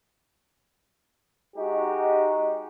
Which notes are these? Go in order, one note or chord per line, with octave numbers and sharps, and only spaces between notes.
G#3 D#4 F#4 G4